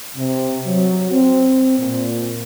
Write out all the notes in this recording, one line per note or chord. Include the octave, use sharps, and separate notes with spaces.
C3
F#3
C4
A#2